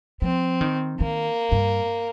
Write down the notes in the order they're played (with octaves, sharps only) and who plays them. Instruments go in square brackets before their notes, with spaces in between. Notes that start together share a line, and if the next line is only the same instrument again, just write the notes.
[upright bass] F3 [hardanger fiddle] C4
[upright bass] D#3
[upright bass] D#3 [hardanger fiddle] A#3
[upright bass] G2